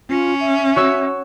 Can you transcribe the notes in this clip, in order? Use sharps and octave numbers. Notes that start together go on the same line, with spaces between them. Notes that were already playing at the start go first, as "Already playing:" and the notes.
C#4 F4
E5
F#4 C#5 E6